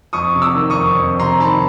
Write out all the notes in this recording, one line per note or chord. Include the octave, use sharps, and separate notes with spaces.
F2 C#6 D#6
C3
D6 E6
D#3
C#6 D#6
F2
F2
C3 A#5 C6
D#3 A5 B5